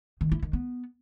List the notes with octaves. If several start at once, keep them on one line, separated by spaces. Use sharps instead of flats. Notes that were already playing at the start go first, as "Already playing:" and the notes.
D#3
E4
D#3
B3